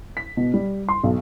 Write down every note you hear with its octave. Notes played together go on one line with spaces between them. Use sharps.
B6
B2
G3
C6
B1